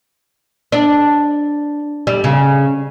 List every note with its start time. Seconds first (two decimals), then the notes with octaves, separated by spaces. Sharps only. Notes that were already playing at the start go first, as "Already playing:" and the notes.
0.72 D4
2.07 G3
2.24 C#3